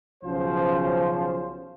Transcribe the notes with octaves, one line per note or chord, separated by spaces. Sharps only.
B1 C#3 F3 C#4 F#4 C5